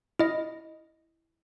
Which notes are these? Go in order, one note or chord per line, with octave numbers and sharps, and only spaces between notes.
E4 D#5